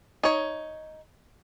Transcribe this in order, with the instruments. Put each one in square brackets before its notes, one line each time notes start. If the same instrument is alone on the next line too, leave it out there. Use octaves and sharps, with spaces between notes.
[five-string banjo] D#4 C#5